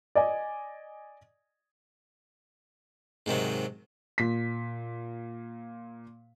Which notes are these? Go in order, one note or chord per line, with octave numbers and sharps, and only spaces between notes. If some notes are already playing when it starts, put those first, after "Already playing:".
D5 D#5 G#5
G#2 C3 D#3 F#3
A#2 B6